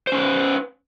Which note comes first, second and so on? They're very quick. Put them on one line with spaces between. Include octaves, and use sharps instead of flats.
C5 C#4 B4